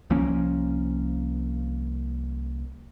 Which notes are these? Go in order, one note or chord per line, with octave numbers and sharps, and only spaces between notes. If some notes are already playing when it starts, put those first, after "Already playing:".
C2 F3 A#3 C#4